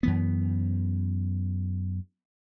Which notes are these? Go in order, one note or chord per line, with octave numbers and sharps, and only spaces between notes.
F#2 E3 B3